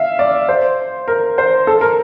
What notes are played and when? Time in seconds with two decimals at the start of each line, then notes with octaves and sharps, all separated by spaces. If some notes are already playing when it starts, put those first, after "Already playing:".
Already playing: E5 F5
0.19 D5
0.49 C5
1.08 A#4
1.38 C5
1.67 A4
1.81 A#4